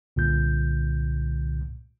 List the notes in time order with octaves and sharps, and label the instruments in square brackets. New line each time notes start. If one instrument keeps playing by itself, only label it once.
[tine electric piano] C2 A#2 D3 G6